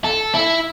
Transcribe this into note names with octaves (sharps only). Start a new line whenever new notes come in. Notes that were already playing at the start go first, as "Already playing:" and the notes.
A4
E4